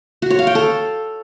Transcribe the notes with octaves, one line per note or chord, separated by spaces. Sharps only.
F#4
C#5
F5
G5
A4